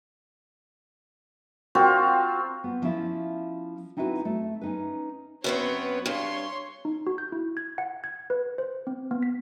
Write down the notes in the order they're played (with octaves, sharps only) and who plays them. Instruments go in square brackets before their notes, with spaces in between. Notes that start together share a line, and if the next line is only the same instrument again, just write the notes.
[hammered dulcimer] C4 F4 F#4 A#4
[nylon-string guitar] B3
F3 C#4 E4 F4
C4 D#4 E4 F#4 B4
A3
C#4 D#4 B4
[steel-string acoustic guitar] F#2 B3 C4 [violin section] B4 C#5
[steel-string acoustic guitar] G2 [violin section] C#5 C6
[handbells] D#4
F#4
G6
E4
G#6
F#5
G#6
B4
C5
C4
B3
B6